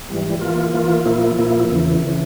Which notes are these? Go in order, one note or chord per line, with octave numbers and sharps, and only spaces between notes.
G#2 E3 G3
E3 A#3 F4
E3 A#3 F4
A#2 F3 A#3 E4
A#2 F3 A#3 E4
E2 C#3 E3
C#3 E3